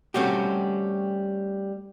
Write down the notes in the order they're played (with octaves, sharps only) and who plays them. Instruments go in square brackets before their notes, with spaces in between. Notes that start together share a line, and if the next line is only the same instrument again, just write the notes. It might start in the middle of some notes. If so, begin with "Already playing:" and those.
[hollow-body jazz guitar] G3 A3 C4 C#4 F#4 G4